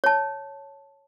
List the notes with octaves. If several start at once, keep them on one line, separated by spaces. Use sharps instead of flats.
C#5 A5